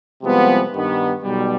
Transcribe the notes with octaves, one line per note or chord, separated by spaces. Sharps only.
C2 C3 F3 G#3 B3
G2 D#3 B3
B1 B2 G3